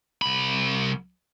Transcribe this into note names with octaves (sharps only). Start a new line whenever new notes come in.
C2 B5